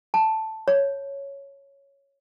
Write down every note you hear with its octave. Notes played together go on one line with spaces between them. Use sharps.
A5
C#5